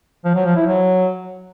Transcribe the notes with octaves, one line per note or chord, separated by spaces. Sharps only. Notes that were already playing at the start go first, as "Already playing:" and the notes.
F3
F#3
F3
E4
F#3